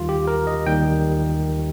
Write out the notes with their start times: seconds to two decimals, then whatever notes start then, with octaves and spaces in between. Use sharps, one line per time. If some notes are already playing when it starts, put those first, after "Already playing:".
Already playing: D#2 D#3 G3 F4
0.09 G4
0.27 A#4
0.47 D#5
0.67 D#2 D#3 G3 G5